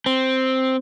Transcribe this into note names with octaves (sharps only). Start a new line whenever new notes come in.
C4